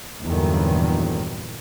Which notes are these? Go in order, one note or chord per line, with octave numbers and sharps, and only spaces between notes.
E2 G2 A#2 D3 D#3 F#3